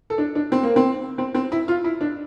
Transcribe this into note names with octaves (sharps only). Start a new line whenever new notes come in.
A4
D4
D4
C4
A#3
C4
C4
C4
E4
F4
E4
D4